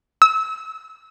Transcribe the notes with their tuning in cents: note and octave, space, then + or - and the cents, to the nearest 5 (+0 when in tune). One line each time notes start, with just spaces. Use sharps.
E6 -30